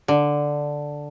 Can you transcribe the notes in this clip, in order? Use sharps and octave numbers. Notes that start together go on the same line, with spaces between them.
D3